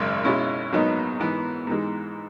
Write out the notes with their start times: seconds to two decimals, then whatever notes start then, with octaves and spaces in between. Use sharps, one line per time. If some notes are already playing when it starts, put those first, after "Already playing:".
Already playing: G#1 F#2 C#3 G#3
0.24 B2 G#3 C#4 E4
0.72 A#1 G#2 F#3 B3 D#4
1.19 G#2 E3 B3
1.67 G#2 E3 G#3